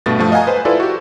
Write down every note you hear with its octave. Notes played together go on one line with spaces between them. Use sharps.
G2 B2 A3 A6
G2 F3 A3
D#5 F5 F#5 G#5 A#5
B4 C5
E4 F4 A4 B4 C5 D5
F#4 G4